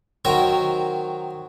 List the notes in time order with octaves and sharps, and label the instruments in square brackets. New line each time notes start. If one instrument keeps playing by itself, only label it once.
[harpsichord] D#3 F#3 C4 A#4 A#5 C#6